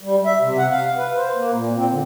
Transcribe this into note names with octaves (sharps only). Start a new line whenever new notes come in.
G3
E5
C3
F#5
F5
B4
C5
A#3
A#2
C4
D3